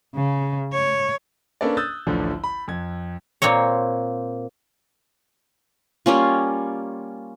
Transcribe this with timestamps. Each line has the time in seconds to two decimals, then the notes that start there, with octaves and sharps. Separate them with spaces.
0.16 C#3
0.73 C#5
1.61 A#3 C#4 D4 A4 B4 D5
1.77 D#6 E6 F#6 G6 A6
2.07 A1 D2 D3 F3
2.44 B5
2.68 F2 G#6
3.42 A#2 A#3 C4 C#5
6.06 G3 A#3 C#4 F4